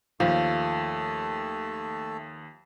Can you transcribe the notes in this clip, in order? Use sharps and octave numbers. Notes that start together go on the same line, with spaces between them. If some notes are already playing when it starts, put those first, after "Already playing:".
D#2 F3 A3 E5 A5